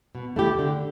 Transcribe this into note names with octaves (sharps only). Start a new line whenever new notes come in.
B2
A3 E4 G4
D3